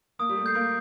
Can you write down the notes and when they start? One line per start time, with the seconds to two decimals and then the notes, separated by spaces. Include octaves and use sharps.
0.19 A#3 D#6
0.29 G3
0.37 A3
0.46 G6 C7
0.55 A#3